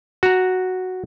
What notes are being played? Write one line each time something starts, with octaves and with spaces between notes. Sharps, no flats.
F#4 A#5